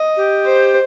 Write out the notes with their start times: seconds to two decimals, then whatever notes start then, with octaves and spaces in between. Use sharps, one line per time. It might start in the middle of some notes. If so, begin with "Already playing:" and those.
Already playing: D#5
0.17 G4
0.45 C5